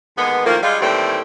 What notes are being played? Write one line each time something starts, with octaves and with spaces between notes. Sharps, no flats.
D#2 D3 G#3 B3
A2 D#3 F3 A#3
G3 G#3 F4
D#2 A2 E3 G3 A3 C4